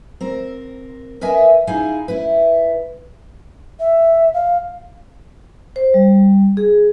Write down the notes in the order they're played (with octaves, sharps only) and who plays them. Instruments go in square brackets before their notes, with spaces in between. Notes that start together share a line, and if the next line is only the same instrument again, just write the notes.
[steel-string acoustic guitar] C4 A#4
A#4 B4 D#5 E5 G#5
D#4 E4 G#4 F5 G#5
E4 B4
[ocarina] E5
F5
[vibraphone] C5
G3
G#4